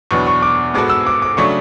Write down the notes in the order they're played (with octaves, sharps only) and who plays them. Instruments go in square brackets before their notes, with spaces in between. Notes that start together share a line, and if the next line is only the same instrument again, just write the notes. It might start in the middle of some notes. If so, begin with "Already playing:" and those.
[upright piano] E2 B2 F#3 B3 D4 [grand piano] C#6
[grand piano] C#6
D6
[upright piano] G#2 G#3 B3 F#4 A4 [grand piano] D6
[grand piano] E6
D6
D6
[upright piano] C#3 F#3 A3 D4 [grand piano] C#6